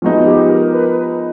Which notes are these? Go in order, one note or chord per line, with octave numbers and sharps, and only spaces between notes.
F3 G#3 B3 D#4 F#4
G4
A#4
B4